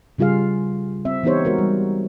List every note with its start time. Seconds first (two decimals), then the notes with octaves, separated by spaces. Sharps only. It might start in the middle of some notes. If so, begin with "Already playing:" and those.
0.18 C#3 G3 F4 G#4 F5
1.05 C4 E5
1.23 E3 B3 D#4 G4 C5 C#5
1.45 G#3 F#4 A#4 C5
1.58 G3